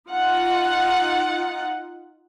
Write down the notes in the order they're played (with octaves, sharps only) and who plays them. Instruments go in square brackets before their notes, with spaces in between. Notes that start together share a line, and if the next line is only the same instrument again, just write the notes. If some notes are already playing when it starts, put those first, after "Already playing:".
[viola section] D#4 F4 F#5